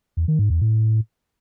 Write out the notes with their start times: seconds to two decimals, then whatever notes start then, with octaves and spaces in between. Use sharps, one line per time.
0.17 E2
0.28 D#3
0.39 G#2
0.50 E2
0.61 A2